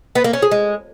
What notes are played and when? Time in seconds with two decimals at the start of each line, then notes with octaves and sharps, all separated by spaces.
0.15 B3
0.24 A#3
0.33 C#4
0.42 G#4
0.51 G#3